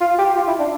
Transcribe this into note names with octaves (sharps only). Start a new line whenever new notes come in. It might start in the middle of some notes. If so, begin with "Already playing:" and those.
F4
G4
F4
E4
D4